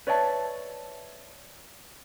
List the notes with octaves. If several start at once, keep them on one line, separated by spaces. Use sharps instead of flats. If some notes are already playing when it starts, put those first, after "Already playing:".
B4 C#5 D5 E5 G5 A5